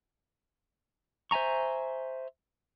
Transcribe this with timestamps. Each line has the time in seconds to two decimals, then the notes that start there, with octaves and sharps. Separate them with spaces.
1.31 C5 E5 G#5 A#5 C#6